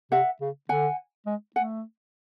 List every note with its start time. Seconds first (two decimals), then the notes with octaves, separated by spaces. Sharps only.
0.12 C3 E5 F#5
0.41 C#3
0.69 D3 F#5 G#5
1.26 G#3
1.56 A3 F#5 G#5